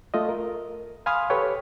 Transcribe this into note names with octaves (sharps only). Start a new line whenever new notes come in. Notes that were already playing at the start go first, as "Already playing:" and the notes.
A3 F4 D#5
A#4
F5 G#5 B5 C6 D#6 F6
G4 A4 B4 C#5 G5